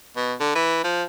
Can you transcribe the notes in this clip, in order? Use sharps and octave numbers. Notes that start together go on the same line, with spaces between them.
B2
D3
E3
F3